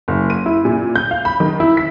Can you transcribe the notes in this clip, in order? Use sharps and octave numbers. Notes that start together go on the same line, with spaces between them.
F#1
D#7
E4
A#2
G6
F5
B5
D#3
E4
B6